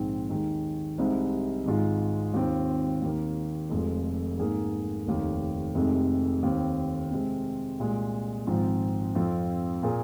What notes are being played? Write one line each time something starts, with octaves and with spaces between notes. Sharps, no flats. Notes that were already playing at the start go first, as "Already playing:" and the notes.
Already playing: A#1 G#2 D#3 C4 G#4
D#2 D#3 G#3
C2 C3 G#3 D#4 C5
G#1 G#2 G#3 F4
D#2 D#3 C4 F4
D#2 D#3 A#3
F1 F2 F3 G#3
G#2 D#3 A#3 G#4
F1 D#2 D#3
F1 F2 C3 D#3 G#3
D#2 D#3 C4
C3 G#3 C4
C2 A#2 G#3
G#1 G#2 F3 C4 F4
F2 F3 C4 F4
A#2 A#3 G#4